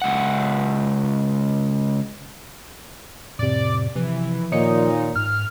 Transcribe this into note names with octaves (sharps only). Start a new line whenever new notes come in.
C#2 F#5
F2 A2 C3 D5
C3 E3 F3
A#2 D#3 D#4 C#5 C#7
G#2 F6